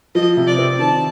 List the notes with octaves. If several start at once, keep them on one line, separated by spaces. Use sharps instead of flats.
F3 D#5
C3
D5
C4
D#3 A5